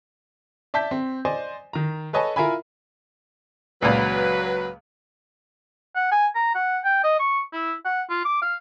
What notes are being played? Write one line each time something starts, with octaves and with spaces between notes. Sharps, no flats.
D5 E5 A5 G6 B6
C4
C5 D5 D#5 G#5
D#3 A#5
A4 B4 C#5 D#5 G#5 A5
E4 F4 A#4 E5 G#5 B5
C#2 A#2 F#3 B4
F#5
G#5
A#5
F#5
G5
D#5
C#6
E4
F#5
F4
D6
F5